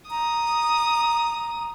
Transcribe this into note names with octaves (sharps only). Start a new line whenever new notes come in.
A#5 D#6